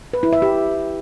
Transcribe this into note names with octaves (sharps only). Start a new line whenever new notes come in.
B4
E4
E5
G4